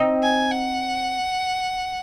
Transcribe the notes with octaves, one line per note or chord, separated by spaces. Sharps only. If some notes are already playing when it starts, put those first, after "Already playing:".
Already playing: C4 D#4
G#5
F#5